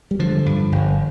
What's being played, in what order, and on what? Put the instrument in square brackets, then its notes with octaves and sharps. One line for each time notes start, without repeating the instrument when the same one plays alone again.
[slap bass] G3
D3 F3
G2
G1